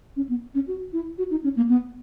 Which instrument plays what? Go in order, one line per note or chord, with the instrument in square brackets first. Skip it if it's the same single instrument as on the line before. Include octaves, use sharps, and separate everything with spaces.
[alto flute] C#4
B3
C#4
F#4
E4
F#4
D#4
C#4
A#3
B3